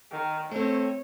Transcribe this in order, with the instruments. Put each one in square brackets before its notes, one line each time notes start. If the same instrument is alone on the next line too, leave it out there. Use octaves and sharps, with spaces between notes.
[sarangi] D#3
[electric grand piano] A3 C4 [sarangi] C#5